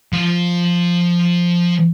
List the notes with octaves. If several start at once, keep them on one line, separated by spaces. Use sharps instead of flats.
F3 F5